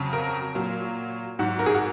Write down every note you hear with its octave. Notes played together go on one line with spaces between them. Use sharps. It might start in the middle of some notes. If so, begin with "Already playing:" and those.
Already playing: F2 C#3 F#3
A#4
A#2 F#3
G#2 F#3 F#4
A#4
G#4
F#4